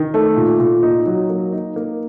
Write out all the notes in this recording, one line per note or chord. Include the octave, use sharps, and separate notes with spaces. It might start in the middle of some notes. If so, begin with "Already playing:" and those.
Already playing: D#3
A3
A#2
A#2
D#4
F#3
A#3
D#4
A#3